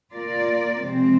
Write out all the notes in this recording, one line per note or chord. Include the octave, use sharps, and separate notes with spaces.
A#3 F4 A#4 D5
C3 F3 G#3 C4